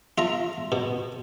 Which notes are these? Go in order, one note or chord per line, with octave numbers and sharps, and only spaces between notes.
F4 E5 A#5
B2